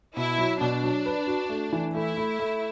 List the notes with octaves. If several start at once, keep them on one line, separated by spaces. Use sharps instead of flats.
B2 E4
F#3
B2 D4
F#3
B4
F#4
A3
E3
A3 E4
A3
A3